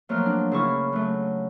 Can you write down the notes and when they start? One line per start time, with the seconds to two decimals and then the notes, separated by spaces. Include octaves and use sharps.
0.09 F3 F#3 A3 A#3 A#5 F6
0.26 D4
0.52 C#3 E4 C#6 F6
0.93 F#3 A3